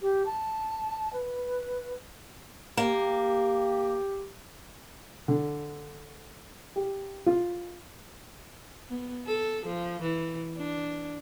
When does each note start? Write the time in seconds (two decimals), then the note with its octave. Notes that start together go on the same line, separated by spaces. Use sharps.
0.01 G4
0.25 A5
1.13 B4
2.77 A#3 G4
5.28 D3
6.76 G4
7.26 F4
8.89 B3
9.26 A4
9.66 F3
10.02 E3
10.56 D4